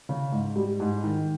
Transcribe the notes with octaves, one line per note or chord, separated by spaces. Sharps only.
C#3
G#2
G3
G#2
D#3